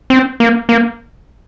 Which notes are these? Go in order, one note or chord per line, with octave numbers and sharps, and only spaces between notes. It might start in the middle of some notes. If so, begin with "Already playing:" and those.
C4
A#3
A#3